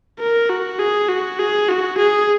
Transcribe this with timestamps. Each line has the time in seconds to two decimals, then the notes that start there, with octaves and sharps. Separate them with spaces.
0.20 A#4
0.50 F#4
0.79 G#4
1.09 F#4
1.40 G#4
1.69 F#4
1.98 G#4